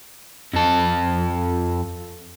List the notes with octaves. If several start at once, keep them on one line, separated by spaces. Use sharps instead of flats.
F2 A4